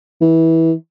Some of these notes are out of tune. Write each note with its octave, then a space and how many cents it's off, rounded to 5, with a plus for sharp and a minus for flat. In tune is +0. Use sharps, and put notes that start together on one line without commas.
E3 -20